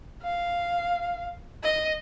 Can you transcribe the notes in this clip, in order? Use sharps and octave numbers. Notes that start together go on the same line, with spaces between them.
F5
D#5